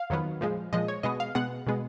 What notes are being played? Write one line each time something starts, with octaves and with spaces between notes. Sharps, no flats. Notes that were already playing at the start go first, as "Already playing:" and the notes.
Already playing: F5
F2 D#3 F#3 B3
A#2 F3 G#3
A#2 F3 G#3 D#5
C#5
B2 G#3 B3 D#5
F5
B2 G#3 B3 F#5
B2 G#3 B3